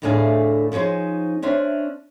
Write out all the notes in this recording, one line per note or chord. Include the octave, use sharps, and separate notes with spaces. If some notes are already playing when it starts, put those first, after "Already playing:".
D2 A2 A3 D4 G#4 F5
F3 C#4 D#4 G#4 C5
C#4 D4 C5 E5